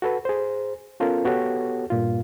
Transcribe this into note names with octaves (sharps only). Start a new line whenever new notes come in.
F#4 A4 B4
G#4 C5
B3 C#4 F4 A4 A#4
B3 F#4 G4 A4 C#5
G2 A#2 F4